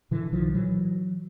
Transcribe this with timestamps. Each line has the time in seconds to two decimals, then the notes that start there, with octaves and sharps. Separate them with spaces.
0.11 A#2 D3 E3
0.32 B1 D#3 F3
0.54 A#2 E3 F#3